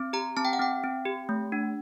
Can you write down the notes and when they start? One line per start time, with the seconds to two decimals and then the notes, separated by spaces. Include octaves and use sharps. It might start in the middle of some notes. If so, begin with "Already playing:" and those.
Already playing: C4
0.13 G4 A#5
0.37 C4 A5
0.45 G5
0.53 F#5
0.59 C4 G5
0.84 C4
1.05 G4
1.29 A3
1.52 D4